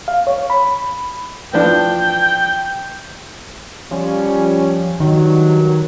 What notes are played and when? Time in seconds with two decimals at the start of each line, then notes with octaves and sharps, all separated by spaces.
0.08 F5
0.27 C#5
0.50 B5
1.53 E3 F3 D4 G5
3.91 F3 G3 C#4
5.00 G2 D#3 F#3